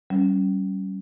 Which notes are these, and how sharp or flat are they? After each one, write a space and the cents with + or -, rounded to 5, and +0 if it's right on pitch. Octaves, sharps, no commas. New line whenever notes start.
G3 -35 C#4 +0